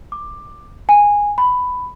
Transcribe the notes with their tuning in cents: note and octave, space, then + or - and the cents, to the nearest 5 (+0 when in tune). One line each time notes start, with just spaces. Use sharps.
D6 +10
G#5 -10
B5 +10